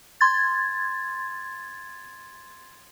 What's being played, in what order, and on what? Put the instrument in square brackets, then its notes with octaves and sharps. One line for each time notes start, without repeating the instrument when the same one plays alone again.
[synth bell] C6 G#6 A6